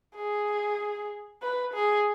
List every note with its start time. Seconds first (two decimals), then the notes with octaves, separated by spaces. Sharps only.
0.15 G#4
1.42 B4
1.74 G#4